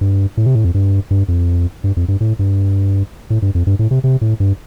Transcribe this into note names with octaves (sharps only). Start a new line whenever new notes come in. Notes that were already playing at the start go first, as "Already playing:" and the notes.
G2
A2
C3
A2
F2
G2
G2
F2
G2
F2
G2
A2
G2
A2
G2
F2
G2
A2
C3
C3
A2
G2